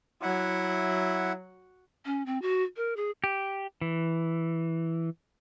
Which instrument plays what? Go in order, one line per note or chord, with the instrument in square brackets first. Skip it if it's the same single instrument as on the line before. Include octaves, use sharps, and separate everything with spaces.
[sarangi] F#3 [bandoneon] E4 E5 F#5
[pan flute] C#4
C4
F#4
A#4
G#4
[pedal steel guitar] G4
E3